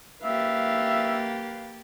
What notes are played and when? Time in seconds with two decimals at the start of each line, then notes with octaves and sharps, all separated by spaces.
0.23 A#3 G4 B4 E5 F5 A6